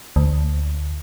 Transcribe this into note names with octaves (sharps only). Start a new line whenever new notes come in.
D2